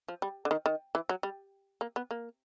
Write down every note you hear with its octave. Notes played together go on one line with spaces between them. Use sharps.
F3
G3
D3
D#3
D#3
E3
F#3
G3
A#3
B3
A#3